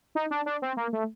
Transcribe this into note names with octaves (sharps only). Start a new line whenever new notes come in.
D#4
D4
D4
C4
A#3
A3